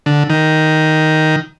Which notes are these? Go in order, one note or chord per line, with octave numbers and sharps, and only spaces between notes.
D3
D#3